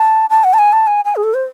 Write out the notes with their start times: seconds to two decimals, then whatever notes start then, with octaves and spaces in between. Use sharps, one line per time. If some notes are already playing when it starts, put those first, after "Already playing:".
Already playing: A5
0.30 A5
0.44 F#5
0.54 A5
0.59 G#5
0.73 A5
0.87 G#5
1.05 G#5
1.16 G#4
1.24 A4
1.34 C5